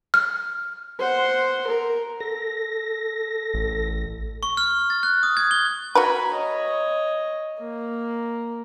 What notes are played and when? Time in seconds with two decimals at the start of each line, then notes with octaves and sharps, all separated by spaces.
0.14 F6
0.99 C5 F#5
1.67 A#4
2.20 A4 A#6
3.54 A1
4.43 C#6
4.57 F6
4.90 A6
5.03 F#6
5.23 D#6
5.37 G#6
5.51 G7
5.95 F#4 A#4 B4 G#5 B5
6.34 C#5 D#5
7.60 A#3